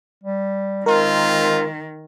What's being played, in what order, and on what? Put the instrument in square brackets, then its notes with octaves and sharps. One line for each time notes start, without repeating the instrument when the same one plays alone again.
[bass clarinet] G3
[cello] D#3 [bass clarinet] G#3 [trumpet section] C4 F4 [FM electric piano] A#4